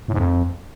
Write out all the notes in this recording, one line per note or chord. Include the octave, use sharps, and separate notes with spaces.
A2
G#2
F2